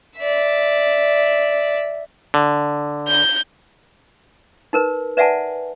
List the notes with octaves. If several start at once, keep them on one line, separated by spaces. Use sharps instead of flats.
D5 E5
D3
G6
D#4 A#4 B4
B4 D5 E5 F#5 G#5 A5